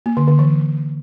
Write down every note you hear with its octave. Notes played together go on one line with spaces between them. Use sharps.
A#3
D3
D3
E3